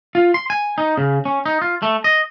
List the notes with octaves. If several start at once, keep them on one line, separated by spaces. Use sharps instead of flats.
F4
C6
G#5
D#4
C#3
C#4
D#4
F4
A3
D#5